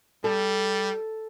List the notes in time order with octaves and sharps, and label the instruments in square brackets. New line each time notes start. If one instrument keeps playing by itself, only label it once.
[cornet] G3 [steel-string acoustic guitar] A4